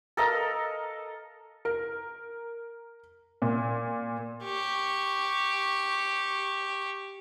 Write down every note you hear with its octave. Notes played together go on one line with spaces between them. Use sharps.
A4 A#4 D#5 F5
A#4
A#2
G4 C#6